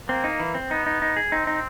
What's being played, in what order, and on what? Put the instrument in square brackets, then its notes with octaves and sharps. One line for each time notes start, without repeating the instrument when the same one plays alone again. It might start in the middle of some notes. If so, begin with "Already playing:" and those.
[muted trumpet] A#3 [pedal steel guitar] C4
[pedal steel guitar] D#4
E3
C4
[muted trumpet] B3 [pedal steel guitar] D#4
[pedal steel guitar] D#4
D#4
G#4
[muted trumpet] C4 [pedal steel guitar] D#4
[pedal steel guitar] D#4